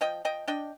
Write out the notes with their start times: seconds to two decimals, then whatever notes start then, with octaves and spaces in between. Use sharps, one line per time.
0.01 F3 D#5 G5
0.25 F3 D#5 G5
0.48 D4 D#5 G5